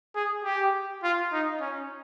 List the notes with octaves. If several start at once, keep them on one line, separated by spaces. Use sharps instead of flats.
G#4
G4
F4
D#4
C#4